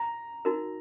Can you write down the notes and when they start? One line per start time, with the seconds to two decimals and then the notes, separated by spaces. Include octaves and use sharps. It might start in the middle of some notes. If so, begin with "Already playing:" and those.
Already playing: A#5
0.45 D#4 F#4 A#4